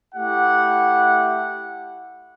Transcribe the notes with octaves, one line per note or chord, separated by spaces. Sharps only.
A3 E4 G4 F#5